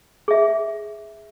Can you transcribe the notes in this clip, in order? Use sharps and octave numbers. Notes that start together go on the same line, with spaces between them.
G#4 E5